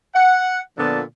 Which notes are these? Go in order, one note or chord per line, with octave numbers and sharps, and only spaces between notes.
F#5
A#2 D3 F3 B3 A5